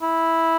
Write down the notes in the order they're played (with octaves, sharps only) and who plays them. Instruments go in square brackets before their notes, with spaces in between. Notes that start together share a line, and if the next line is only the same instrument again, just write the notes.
[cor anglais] E4